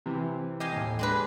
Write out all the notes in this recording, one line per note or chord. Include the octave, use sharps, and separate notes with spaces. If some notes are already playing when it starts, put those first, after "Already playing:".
C3 E3
G4 D#5 F5 G#5
D#2 A2
G#3 D4 B4